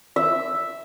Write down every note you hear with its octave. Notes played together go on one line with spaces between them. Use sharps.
E5